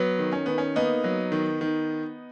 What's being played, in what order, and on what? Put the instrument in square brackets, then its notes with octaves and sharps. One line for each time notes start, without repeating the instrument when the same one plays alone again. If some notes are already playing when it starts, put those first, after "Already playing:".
Already playing: [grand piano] F#3 B3
D#3
C#4
D#3 B3
C#4
A#3 B3 D#4
F#3
D#3
D#3